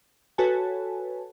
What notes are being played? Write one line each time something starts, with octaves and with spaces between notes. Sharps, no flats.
F#4 A4 B4 C#5 G#5 A5